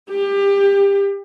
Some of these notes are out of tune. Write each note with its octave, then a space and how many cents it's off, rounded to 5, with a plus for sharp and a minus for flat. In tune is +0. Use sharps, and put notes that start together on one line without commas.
G4 +25